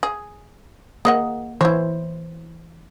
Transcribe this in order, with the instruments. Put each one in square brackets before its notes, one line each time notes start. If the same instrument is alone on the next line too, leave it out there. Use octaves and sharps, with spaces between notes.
[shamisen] G#4
[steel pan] A#3 [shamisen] G#4 D#5 F#5
[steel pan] E3 C5 [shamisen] E4 C#5